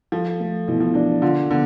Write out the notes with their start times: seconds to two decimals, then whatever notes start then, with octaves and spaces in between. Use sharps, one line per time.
0.12 F3 A4
0.40 A3
0.68 B2 E3
0.80 F3
0.94 E3 D4
1.22 D3 F4
1.50 D3 B3